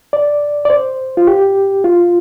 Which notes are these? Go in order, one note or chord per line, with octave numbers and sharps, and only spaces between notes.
D5
D5
C5
F4
G4
F4